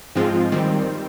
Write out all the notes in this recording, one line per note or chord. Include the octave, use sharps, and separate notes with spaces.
G#2 F3 G#3 C4 F4
D#3 G3 C4